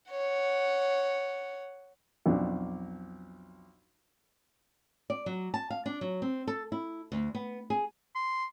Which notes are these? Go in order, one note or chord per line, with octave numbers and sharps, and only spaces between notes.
C#5 F#5
B1 F2 D4
D5
F#3
A5
F5
D4
F#3
C4
A4
E4
D2
B3
G#4
C6